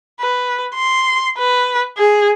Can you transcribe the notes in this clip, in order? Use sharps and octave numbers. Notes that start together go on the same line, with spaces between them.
B4
C6
B4
G#4